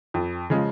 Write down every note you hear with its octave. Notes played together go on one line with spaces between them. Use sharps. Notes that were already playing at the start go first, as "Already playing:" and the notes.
F2
C#3 F3 G#3